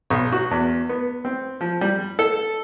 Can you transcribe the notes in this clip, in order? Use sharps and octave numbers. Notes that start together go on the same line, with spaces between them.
B1
F#4
E2
B3
C4
F3
G3
A4